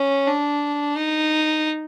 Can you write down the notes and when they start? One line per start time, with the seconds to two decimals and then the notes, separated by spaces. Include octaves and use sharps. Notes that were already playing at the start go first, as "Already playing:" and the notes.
Already playing: C#4
0.27 D4
0.96 D#4